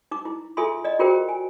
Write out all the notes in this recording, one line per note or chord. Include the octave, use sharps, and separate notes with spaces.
D#4 D6
E4
F4 G#4 A4 E5 G#5 C6
D5 D#5
F4 F#4 G#4 A#4 C5 G5
G#5